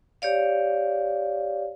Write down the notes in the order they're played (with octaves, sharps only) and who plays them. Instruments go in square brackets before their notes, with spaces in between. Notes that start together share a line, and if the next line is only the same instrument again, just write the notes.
[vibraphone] G4 C#5 D5 F5